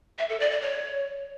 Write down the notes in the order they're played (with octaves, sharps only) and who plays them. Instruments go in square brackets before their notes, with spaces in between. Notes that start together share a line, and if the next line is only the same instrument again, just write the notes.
[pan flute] E5
A4
D5
D5
C#5